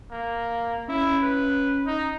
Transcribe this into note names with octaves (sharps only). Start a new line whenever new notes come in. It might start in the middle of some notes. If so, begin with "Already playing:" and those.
A#3
C#4 E4
B4
D#4